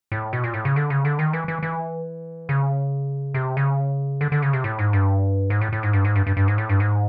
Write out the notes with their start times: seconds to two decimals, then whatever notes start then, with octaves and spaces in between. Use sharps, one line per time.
0.12 A2
0.33 B2
0.44 A#2
0.54 A2
0.65 C#3
0.76 D3
0.90 C#3
1.05 D3
1.19 D#3
1.33 E3
1.48 E3
1.63 E3
2.49 C#3
3.34 C3
3.57 C#3
4.21 D3
4.32 D3
4.42 C#3
4.53 C3
4.64 A2
4.79 G#2
4.93 G2
5.50 G#2
5.61 A2
5.73 A2
5.83 G#2
5.93 G2
6.05 G#2
6.16 G2
6.27 G2
6.37 G2
6.48 G#2
6.58 A2
6.69 G2
6.80 G#2